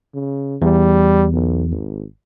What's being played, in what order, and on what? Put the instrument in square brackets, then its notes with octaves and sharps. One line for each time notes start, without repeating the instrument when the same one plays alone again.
[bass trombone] C#3
[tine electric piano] E2 [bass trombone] G3
[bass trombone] B1
G#1